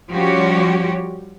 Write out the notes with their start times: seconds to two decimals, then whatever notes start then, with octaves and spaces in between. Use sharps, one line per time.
0.12 F3 G3 C#4 F#4 G4 C#5